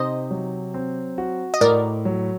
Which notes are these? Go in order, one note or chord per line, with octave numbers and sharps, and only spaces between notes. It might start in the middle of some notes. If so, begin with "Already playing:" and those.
Already playing: C3 D#4 C5 D#5
F#3
C4
F#4
D#5
A2 A#4 D5
F#3